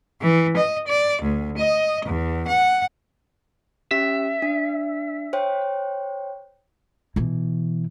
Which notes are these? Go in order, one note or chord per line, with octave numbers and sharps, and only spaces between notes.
E3
D#5
D5
D2
D#5
E2
F#5
C#4 G4 E5
D4
C5 C#5 G5
B2 E3